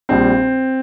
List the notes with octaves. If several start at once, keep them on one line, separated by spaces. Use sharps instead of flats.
A#1 A#2 G3 C4